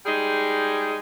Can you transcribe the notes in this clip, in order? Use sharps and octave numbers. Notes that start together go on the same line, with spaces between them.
G3 G#3 D#4 G#4